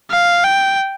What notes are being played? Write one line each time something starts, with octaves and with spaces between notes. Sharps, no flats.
F5
G5